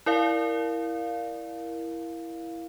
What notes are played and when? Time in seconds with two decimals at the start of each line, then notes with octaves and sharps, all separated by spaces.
0.06 E4 A#4 D5 F5